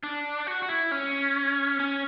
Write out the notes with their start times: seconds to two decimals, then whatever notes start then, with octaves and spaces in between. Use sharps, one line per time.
0.03 D4
0.47 F#4
0.62 F#4
0.69 E4
0.91 C#4
1.80 C#4